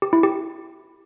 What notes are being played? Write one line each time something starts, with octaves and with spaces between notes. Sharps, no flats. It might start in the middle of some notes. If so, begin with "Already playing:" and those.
G4
E4
G4